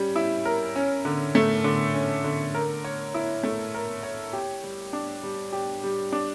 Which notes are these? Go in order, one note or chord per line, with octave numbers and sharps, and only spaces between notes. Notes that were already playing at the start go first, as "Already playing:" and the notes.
Already playing: G3 C#4
E4
A#4
C#4
D3
A3
D3
C#4
D3
A#4
C#5
E4
A3
A#4
C#5
G4
G3
D4
G3
G4
G3
D4